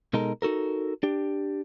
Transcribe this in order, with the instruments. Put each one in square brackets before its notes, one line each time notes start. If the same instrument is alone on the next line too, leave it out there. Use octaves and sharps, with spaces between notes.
[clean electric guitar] B2 G#3 D#4 A4 A#4
D#4 F#4 A4 A#4
D4 G4